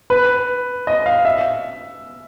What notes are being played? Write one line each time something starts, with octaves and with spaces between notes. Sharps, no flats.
B4
D#5
F5
E5